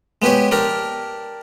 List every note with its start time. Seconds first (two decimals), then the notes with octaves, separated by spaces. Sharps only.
0.22 G#3 B3 G4 B4 C#5
0.51 D4 G4 A#4 A#5